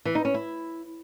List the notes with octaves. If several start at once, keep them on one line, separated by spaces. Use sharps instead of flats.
E3
D#4
C#4
E4